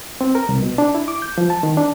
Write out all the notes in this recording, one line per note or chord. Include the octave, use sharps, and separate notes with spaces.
C4
A#4
C2
B2
D4
E4
D6
G6
F3
A5
D#3
D4